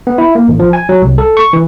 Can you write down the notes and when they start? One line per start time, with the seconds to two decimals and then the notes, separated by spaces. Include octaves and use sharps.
0.07 B3
0.18 E4
0.35 A#3
0.48 A1
0.59 F3
0.73 G#5
0.89 F#3
1.02 C2
1.18 A4
1.37 C#6
1.53 E3